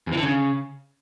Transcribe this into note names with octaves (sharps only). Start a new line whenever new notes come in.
E2
E3
D3
C#3